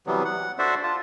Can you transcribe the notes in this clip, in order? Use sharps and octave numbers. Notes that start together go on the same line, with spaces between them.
C3 E3 F#3 G3 B3
F#5
D4 F#4 A4 C5 D5 E5
F4 A5